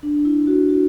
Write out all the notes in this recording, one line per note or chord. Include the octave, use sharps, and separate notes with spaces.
D4
E4
F#4
F#4